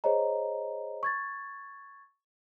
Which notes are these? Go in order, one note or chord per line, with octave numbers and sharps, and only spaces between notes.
G#4 C5 C#5 D#5 A#5
C#6 G#6 A6